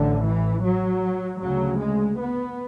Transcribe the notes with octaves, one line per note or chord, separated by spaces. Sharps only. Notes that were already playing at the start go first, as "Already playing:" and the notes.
Already playing: A1 A2 D3
E3
F#3
D2 C#3 F#3
G#3
B3